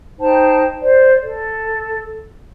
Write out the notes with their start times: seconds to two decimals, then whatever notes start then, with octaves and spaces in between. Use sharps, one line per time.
0.20 D#4 C5 G5 A5
0.81 C5 D5
1.23 A4